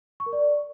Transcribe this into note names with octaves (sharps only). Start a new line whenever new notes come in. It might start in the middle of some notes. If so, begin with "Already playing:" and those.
C#6
A#4
D5